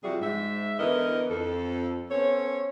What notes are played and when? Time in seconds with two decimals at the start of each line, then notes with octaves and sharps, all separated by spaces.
0.03 C3 F3 G3 E4 F#4 G#4
0.21 G#2 E5
0.78 D3 E3 B3 A#4 D#5
1.30 F2 A4
2.10 B3 C#4 A4 C5 C#5